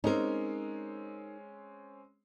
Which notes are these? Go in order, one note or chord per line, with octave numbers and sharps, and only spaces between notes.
G#3 C4 C#4 D#4 A#4